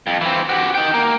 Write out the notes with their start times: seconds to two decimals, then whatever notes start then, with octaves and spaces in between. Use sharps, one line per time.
0.07 F2
0.21 E3 C4
0.49 F#4 G4
0.75 D#4 G5
0.94 A#3